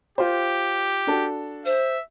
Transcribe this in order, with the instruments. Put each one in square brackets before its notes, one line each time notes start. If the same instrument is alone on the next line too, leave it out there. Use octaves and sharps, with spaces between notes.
[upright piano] F4 C5 [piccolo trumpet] G4
[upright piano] D4 F#4 A4
[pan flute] C5 [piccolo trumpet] E5